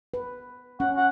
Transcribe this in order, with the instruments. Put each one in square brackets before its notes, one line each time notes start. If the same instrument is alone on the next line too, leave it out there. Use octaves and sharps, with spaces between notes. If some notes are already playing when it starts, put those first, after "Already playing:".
[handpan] B4
[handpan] C#4 [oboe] F#5
[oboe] F#5